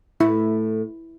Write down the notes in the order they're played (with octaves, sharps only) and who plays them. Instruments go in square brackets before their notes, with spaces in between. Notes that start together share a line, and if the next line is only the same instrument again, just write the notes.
[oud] A2 A3 [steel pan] E4